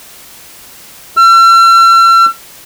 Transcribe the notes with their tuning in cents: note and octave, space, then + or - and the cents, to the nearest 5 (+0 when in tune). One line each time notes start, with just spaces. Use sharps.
E6 +45